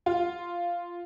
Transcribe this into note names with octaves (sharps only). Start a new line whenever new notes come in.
F4